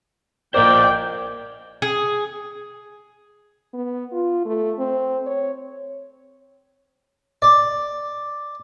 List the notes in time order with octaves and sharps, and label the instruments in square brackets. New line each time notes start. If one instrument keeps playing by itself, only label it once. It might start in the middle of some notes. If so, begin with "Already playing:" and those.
[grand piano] A#1 A#3 A#4 [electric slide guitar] C5 D#5 [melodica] D5 [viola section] G5
[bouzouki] G#4
[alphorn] B3
F4
A3
C4
C#5
[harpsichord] D5